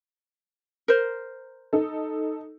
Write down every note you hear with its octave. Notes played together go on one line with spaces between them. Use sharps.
A#4 C5
D#4 A4